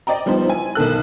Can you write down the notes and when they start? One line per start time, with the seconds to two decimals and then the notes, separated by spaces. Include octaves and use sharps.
0.07 D5 D#5 G5 A#5
0.26 F3 G3 B3 D#4 C5
0.47 E4 G#5
0.75 B1 D#3 A4 F#6